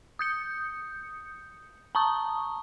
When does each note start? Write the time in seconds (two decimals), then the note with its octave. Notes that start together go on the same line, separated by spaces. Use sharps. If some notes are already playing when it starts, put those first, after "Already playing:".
0.19 D#6 G6 C#7
1.95 A5 A#5 C#6 D#6